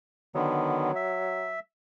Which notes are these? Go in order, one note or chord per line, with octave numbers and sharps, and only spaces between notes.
D3 D#3 F#3 B3
E5